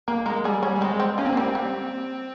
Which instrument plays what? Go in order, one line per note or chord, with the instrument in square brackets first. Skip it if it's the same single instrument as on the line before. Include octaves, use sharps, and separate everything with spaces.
[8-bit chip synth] A#3 [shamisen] A#4
[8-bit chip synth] G#3 [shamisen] A#4
[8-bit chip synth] G3 [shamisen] G#4
[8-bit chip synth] G3 [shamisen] C#4
[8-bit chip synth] G3
[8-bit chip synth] G#3 [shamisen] C4
[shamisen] C4
[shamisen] A#3 [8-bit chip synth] C#4
[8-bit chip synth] C4
A#3
[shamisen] G3 [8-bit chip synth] C4
[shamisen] G3